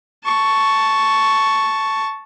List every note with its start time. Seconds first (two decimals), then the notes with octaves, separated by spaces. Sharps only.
0.24 A5 C#6